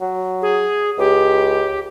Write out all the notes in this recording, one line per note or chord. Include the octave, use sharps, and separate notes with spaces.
F#3
G#4
C#2 G4